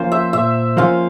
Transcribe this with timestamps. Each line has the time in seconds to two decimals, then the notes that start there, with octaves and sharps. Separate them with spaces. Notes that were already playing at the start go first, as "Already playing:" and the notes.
Already playing: F3 A#3 C#4 F4 C5
0.12 E5
0.33 A#2 E5
0.77 F3 A#3 C#4 F4 F5